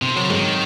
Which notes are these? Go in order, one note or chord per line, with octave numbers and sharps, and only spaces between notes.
C3 C4
C#3 F#3
G#2 D#3